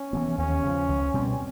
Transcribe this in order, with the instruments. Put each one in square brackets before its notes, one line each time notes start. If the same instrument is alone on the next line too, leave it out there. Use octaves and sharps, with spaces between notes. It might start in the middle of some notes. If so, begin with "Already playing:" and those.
Already playing: [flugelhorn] C#4
[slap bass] E3 G3 B3
[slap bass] D#2 [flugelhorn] C#4
[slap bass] C#3 F3
C#2
B2 G3 C4